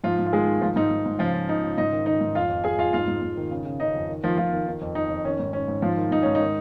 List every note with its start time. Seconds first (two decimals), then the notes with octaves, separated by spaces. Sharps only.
0.04 G#2 F3 F4
0.19 G#2
0.26 F4
0.32 D#3 G#3 G#4
0.47 D#3
0.61 G#2 F3 F4
0.76 G#2 D#4
0.91 G#2
1.06 G#2
1.19 C#3 F3 F4
1.34 C#3
1.49 C#3 D#4
1.64 C#3
1.77 G#2 D#4 D#5
1.93 D#3
2.06 D#3 D#4 D#5
2.21 G#2
2.35 F2 F4 F5
2.49 F2
2.64 F2 G#4 G#5
2.79 F2 F4 F5
2.93 G#2 F4 F5
3.08 G#2
3.22 G#2
3.37 D#3
3.51 C#3
3.66 C#3
3.80 C#3 D#4 D#5
3.95 F2
4.09 D#3
4.23 D#3 F3 F4
4.38 D#3 F3 F4
4.53 D#3
4.67 D#3
4.81 F2
4.95 D#3 D#4
5.10 F2
5.25 D#3 C#4
5.39 G#2
5.53 D#3 C#4
5.68 G#2
5.82 G#2 F3 F4
5.97 D#3
6.11 G#2 D#4
6.23 G#2 C#4
6.35 D#4
6.41 D#3